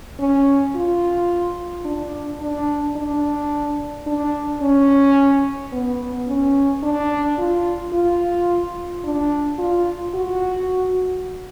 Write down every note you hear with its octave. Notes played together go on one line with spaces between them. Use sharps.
C#4
F4
D4
D4
D4
D4
C#4
B3
C#4
D4
F4
F4
D4
F4
F#4